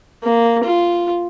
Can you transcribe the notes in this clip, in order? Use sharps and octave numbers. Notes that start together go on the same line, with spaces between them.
A#3
F4